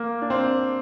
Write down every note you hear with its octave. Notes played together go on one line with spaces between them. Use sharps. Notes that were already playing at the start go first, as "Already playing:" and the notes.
Already playing: A#3
D4
C4